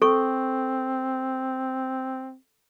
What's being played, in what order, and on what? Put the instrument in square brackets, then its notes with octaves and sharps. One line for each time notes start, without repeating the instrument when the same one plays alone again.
[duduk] C4 [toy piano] A4 C#6